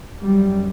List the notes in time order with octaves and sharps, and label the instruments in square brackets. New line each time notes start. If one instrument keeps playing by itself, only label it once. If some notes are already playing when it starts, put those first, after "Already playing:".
[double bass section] F#2 G3